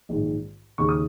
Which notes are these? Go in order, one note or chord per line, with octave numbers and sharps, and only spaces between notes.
A#1 G#2 D#3 G#3
D#2 C#3 G#3 D#4 C#6
D#6